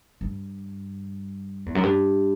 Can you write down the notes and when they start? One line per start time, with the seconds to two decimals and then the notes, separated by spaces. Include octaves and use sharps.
0.21 G2
1.66 E2
1.75 F#2
1.83 G2